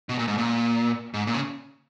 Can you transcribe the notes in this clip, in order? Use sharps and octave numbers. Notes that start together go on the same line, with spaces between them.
B2
A#2
G#2
A#2
G#2
A#2
C#3